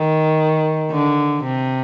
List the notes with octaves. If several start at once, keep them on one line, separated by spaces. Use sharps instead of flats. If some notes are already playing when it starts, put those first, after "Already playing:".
Already playing: D#3
D3
C3